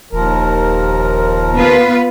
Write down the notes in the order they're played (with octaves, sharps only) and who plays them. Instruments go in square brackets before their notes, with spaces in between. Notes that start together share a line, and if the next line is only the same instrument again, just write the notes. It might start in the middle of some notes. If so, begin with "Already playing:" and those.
[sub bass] D#1 [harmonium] D#2 F3 A#4
[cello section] B3 F4 B4